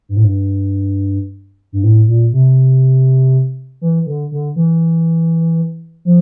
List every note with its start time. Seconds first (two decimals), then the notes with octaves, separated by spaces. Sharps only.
0.09 G2
0.16 A2
0.24 G2
1.72 G2
1.84 A2
2.08 A#2
2.33 C3
3.81 E3
4.06 D3
4.31 D3
4.56 E3
6.05 F3